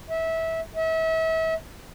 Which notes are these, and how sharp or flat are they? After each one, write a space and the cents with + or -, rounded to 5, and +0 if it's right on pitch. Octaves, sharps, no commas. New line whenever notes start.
E5 -20
E5 -35